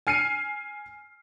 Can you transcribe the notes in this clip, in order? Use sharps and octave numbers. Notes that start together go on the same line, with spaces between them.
G#5 F6 C7 C#7 D#7